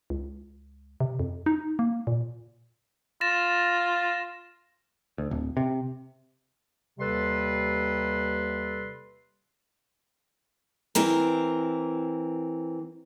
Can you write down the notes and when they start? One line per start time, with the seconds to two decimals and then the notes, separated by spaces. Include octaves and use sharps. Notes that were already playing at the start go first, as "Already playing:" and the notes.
0.10 C#2
1.00 C3
1.19 F2
1.46 D#4
1.79 A#3
2.07 A#2
3.21 F4 A6 A#6 E7
5.18 D2
5.31 D1
5.57 C3
6.99 D#2 C3 G3 A4 B4 C6
10.95 E3 C4 A#4